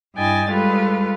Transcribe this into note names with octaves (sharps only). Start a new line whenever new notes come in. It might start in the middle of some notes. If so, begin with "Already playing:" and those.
G2 E4 D#5 G5 G#5 A6
G3 G#3 F4 A4 B4